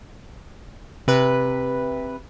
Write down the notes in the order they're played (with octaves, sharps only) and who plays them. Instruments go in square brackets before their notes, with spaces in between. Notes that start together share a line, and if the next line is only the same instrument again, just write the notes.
[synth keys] C3 B4